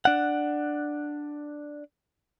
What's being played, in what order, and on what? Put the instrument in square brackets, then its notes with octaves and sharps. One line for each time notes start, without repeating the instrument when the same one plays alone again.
[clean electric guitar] D4 F#5